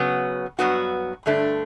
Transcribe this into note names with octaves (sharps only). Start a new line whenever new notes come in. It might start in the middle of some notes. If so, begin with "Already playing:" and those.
Already playing: C#3 F#3 B3
G2 F#3 B3 F#4
G2 D3 A3 D4